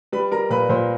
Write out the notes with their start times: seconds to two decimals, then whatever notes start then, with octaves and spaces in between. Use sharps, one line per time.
0.12 G3 B4 B5
0.32 G3 A#4 A#5
0.50 A#2 B4 B5
0.69 A#2 C5 C6